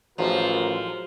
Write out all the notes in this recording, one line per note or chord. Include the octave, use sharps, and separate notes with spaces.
A1 F3 F#3 G#3 F4 A#4